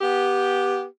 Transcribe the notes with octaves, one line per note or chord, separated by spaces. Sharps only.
B3 G4